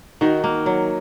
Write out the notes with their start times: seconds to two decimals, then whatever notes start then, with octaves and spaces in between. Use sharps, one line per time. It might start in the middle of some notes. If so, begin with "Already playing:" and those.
0.21 D#3 D#4 F#4
0.44 A#3
0.66 F#3